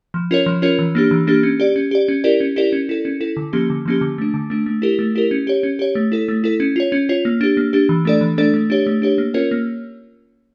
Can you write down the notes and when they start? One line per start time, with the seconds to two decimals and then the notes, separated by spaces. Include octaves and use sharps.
0.14 F3
0.31 C#4 F4 A#4 C#5
0.46 F3
0.62 C#4 F4 A#4 C#5
0.79 E3
0.95 A#3 D4 G4
1.11 E3
1.27 A#3 D4 G4
1.43 C#4
1.60 G4 D5
1.76 C#4
1.91 G4 D5
2.08 C#4
2.24 E4 G4 A#4 D5
2.40 C#4
2.56 E4 G4 A#4 D5
2.73 C#4
2.89 E4 A4
3.05 C#4
3.20 E4 A4
3.37 D3
3.53 F3 A#3 C#4 G4
3.70 D3
3.86 F3 A#3 C#4 G4
4.01 D3
4.18 A3 D4
4.34 D3
4.50 A3 D4
4.66 A3
4.82 E4 G4 A#4
4.99 A3
5.15 E4 G4 A#4
5.31 C#4
5.47 G4 C#5
5.63 C#4
5.79 G4 C#5
5.95 A3
6.12 E4 A4
6.28 A3
6.44 E4 A4
6.60 C#4
6.76 F4 C#5
6.92 C#4
7.09 F4 C#5
7.25 A#3
7.41 D4 G4
7.57 A#3
7.73 D4 G4
7.89 E3
8.05 A3 D4 A4 D5
8.21 E3
8.38 A3 D4 A4 D5
8.54 A3
8.70 D4 G4 C#5
8.87 A3
9.02 D4 G4 C#5
9.18 A#3
9.34 C#4 F4 A#4 C#5
9.51 A#3